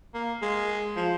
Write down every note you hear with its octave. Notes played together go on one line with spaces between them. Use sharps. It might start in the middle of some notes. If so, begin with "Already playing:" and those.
A#3
G#3
F3